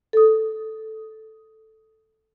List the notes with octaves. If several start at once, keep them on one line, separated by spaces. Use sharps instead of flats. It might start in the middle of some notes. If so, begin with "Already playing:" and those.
A4 D#6